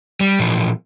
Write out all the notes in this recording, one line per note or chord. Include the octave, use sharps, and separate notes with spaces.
G3
A#2 E3 F3